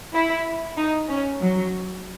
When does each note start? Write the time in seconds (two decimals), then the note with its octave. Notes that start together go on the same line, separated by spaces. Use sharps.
0.14 E4
0.77 D#4
1.09 C#4
1.42 F#3